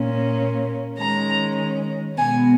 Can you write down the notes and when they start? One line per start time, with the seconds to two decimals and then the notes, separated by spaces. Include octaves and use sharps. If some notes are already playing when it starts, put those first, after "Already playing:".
Already playing: A#2 A#3 C#4
0.98 D#3 G#3 C#4 A#5
2.17 B2 G#3 B3 G#5